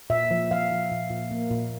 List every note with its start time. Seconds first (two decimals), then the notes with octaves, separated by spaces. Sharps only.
0.10 A#2 E5
0.31 F3
0.51 F3 F5
0.71 F3
0.92 A#2
1.11 A#2
1.31 A#3
1.51 A#2